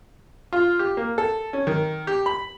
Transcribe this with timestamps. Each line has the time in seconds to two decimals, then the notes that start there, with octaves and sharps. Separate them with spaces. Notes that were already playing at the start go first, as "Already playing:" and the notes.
0.53 F4
0.79 G4
0.97 A#3
1.18 A4
1.53 C#4
1.67 D#3
2.07 G4
2.26 B5